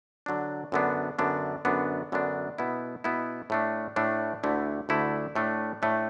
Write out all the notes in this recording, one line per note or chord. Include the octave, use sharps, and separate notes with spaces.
D3 F#3 D4
F#2 D3 B3 D4
F#2 D3 B3 D4
F#2 D3 B3 D4
F#2 D3 B3 D4
B2 B3 E4
B2 B3 E4
A2 A3 D4
A2 A3 D4
D2 D3 A3 E4
D2 D3 A3 E4
A2 A3 D4
A2 A3 D4